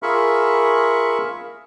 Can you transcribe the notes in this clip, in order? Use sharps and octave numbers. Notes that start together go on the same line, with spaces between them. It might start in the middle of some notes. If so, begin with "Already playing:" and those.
F4 G#4 A#4 E5 B5 C#6